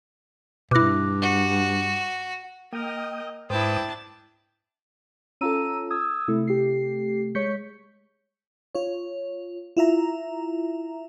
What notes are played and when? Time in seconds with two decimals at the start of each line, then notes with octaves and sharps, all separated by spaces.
0.71 G2 B2 E4 D6 F#6 A#6
1.22 F#4
2.73 A#3 A#4 D#5 G5 D#6
3.50 G#2 D4 E4 B4 C5 G5 A5 D#6
5.41 C#4 F4 A4 A#5 E6 D#7
5.90 D#6 E6 G#6
6.28 C3 A3 E4
6.47 G4 C7
7.35 G#3 C#5 C#6 G6 B6 C#7
8.75 F4 C#5
9.77 E4 F4 E5 A#5